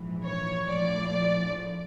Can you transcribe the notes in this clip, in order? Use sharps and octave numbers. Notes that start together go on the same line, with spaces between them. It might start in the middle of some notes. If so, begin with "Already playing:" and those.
Already playing: A#1 G#2 E3
C#5
A#1 A2 F3 D5